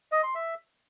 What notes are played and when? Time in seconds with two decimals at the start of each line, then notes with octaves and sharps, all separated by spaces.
0.12 D#5
0.23 C6
0.35 E5